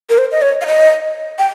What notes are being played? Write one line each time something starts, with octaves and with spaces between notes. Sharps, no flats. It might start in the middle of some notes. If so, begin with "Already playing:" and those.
A#4
C5
D#5
C#5
F5
D#5
G5